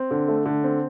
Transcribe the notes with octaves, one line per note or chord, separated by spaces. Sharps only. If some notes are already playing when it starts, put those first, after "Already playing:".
Already playing: C4
D3
A3
D3
C4